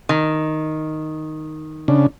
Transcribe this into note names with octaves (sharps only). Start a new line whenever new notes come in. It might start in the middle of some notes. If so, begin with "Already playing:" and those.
D#3
C#3 D4